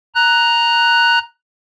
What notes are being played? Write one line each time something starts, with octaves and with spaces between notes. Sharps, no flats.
A#5 F#6